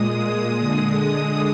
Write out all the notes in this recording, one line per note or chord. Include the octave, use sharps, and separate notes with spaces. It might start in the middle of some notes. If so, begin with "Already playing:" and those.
Already playing: A#2 G#3 D#6
D#6
D3 G#3